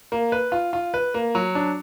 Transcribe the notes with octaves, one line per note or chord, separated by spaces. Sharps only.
A#3
B4
F4
F4
B4
A#3
F#3
D4